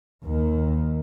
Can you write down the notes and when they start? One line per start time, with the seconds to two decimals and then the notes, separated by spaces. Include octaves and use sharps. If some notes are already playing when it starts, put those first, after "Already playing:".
0.24 D#2 D#3